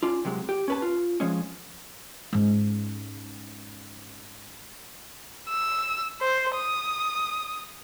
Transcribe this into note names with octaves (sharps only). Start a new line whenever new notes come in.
C#4 D4 F4
C3 F#3 G#3
G4
C#4 B4 A5
F4
F3 G#3 C#4
G#2 C#4
E6
C5
D#6